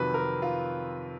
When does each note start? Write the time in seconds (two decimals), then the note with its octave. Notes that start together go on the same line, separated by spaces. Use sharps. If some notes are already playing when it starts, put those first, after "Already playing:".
Already playing: F2 C3 D#3 F#3 B4
0.14 A#4
0.42 F4